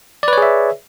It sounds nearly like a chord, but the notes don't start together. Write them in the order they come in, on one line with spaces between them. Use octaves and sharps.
D5 B4 C#5 G#4 E5